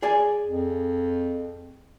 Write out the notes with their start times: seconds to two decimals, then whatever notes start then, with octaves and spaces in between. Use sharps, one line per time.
0.02 G#4 D5 G#5
0.46 F2